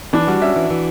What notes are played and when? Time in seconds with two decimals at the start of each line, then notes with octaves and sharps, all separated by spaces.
0.13 E3 D4
0.27 G3 F#4
0.42 C#4 E5
0.56 E3
0.70 E3